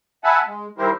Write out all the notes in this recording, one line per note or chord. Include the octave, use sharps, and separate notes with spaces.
E5 F#5 G#5 A5 B5
G#3
D#3 G3 E4 G4 A#4 C5